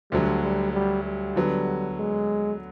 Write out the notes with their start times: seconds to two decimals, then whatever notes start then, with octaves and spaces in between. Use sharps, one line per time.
0.11 D2 D3 F#3 G3
0.42 G3
0.73 G3
1.04 G3
1.36 D3 F#3 B3
1.98 G#3